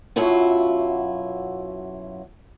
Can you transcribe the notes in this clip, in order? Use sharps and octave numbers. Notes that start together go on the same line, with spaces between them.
F#2 B2 F#3 E4 F4